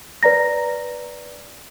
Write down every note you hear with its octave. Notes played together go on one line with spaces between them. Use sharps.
B4 D5 A#5 A#6